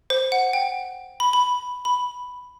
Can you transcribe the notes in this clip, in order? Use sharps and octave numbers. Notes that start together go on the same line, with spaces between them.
C5
F#5
G5
B5
B5
B5